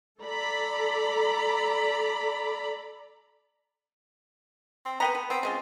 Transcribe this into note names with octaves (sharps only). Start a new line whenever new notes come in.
A4 D5 A#5 B5
C4
B3 B4 G5 A#5
B4
B3 C4
C#3 G#3 F4